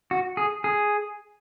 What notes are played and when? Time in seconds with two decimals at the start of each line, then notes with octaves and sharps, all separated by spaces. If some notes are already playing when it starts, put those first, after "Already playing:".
0.11 F#4
0.37 G#4
0.64 G#4